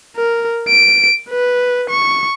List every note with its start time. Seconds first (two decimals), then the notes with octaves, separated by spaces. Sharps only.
0.16 A#4
0.68 D7
1.29 B4
1.90 C#6